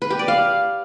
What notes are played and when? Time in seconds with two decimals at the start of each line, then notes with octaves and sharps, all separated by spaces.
0.02 B4
0.10 G4
0.19 D5
0.28 F5